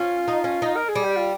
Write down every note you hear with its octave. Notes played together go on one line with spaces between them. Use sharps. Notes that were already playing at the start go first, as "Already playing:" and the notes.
Already playing: C#4 F4
D#4
C#4
D#4
A#4
G#4
G3
G4
F4